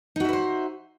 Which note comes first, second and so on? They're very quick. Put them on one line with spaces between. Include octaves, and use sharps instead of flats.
D#4 F#4 E5 B4 C5